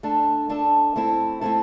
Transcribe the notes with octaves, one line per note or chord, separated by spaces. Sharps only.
A3 D4 A4
A3 D4 A4
A3 C4 E4 A4
A3 C4 E4 A4